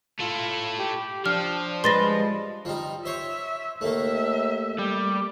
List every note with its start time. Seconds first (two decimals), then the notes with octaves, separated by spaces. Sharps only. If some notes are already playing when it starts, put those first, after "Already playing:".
0.20 A3 E4 F4
0.79 G4
1.26 F3 D4 F6
1.84 G3 G#3 B4 C6 A6 A#6
2.65 F3 G3 D#4
3.06 C5 C#5 E5
3.81 D#2 A3 A#3 E5
4.78 G3